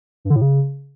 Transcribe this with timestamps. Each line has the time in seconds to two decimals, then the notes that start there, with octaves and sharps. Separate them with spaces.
0.25 G2
0.30 D3
0.36 A2
0.41 C#3